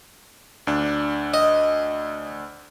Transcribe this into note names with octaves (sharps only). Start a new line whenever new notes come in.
D2 D4
D#5